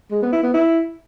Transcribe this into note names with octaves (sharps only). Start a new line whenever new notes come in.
G#3
B3
E4
B3
E4